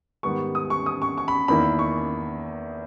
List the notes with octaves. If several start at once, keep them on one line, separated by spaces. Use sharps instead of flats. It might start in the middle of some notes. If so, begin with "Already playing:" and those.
G#2 D#3 G3 B3 C#6
D#6
C#6
D#6
C#6
C#6
B5
E2 D#3 A#3 E4 B5
C#6